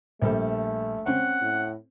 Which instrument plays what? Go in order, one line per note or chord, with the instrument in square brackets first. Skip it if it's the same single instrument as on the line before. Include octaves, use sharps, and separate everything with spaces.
[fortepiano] A#1 G3 A4 [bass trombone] A3
[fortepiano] C4 C#4 [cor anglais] F#5
[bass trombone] A2